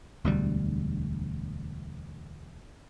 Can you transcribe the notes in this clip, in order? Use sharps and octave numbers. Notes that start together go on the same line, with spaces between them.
E1 D2 G3